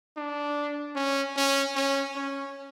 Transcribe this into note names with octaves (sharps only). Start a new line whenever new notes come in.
D4
C#4
C#4
C#4
C#4